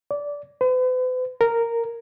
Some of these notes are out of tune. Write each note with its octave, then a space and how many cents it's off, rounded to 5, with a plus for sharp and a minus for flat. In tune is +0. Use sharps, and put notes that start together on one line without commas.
D5 -15
B4 +45
A#4 -10